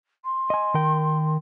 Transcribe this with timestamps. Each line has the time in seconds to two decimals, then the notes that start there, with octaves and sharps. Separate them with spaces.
0.24 C6
0.50 D#5 G#5
0.74 D#3 A#4 G5